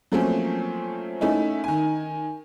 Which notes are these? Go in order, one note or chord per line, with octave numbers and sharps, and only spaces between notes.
F3 F#3 A3 A#3 C4 C#4
A3 C#4 D#4 E4
D#3 G#5